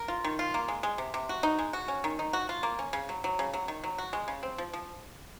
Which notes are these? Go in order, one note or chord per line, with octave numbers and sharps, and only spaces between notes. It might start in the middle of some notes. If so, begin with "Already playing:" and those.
Already playing: A#4
F4
D#3
F4
A#3
G#3
G#3
C3
C3
F#4
D#4
G#3
F#4
C#4
D#3
D#4
F#4
F4
A#3
C#4
C#3
F#3
F#3
C#3
F#3
D#3
F#3
F#4
G#3
C#3
C4
F3
F3